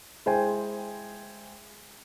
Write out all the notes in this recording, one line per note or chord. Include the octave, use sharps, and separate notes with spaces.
G#3 E4 C5 G5 G#5